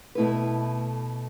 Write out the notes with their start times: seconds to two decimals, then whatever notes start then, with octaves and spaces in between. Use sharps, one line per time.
0.15 B2 A3 E4 B4